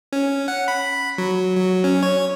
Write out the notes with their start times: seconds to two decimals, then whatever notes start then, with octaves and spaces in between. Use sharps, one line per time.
0.13 C#4
0.48 F#5
0.68 B5
1.18 F#3
1.57 F#3
1.84 C#4
2.03 C#5